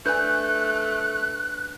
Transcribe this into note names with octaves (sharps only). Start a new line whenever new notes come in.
A3 D4 B4 G#5 F#6 G6